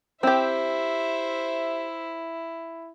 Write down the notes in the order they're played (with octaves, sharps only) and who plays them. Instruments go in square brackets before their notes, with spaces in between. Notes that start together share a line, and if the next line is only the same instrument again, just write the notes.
[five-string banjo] C4 G4 [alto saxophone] E4 [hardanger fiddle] C5 E5